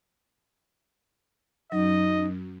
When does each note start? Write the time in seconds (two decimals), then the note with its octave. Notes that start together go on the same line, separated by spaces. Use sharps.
1.72 F#2 F#3 D#4 D#5